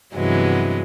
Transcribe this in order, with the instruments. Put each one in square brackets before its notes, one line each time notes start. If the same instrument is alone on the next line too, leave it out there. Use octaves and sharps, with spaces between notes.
[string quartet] G2 C3 E3 F#3 G#3 B3